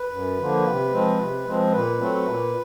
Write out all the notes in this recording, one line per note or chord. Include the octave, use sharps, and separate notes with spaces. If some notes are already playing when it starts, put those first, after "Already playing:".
Already playing: B4
F#2
D3 F3 A#3
C3
F3 G#3 C4
C3
F3 G#3 C4
A#2 B4
F#3 A3 C4
A#2